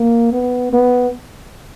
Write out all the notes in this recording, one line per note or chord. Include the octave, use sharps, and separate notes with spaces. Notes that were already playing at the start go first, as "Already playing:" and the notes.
Already playing: A#3
B3
B3